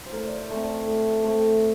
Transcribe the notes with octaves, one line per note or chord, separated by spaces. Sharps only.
C5
A2 A#4
D5
C5
A3 C4
D5
A2
A3 C4